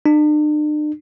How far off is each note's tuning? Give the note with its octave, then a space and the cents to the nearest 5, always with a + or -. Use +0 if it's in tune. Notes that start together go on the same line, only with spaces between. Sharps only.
D4 +45